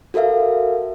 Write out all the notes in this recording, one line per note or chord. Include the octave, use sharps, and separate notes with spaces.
F#4 A4 A#4 E5 F5